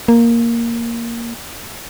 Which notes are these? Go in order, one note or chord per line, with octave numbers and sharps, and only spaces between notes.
A#3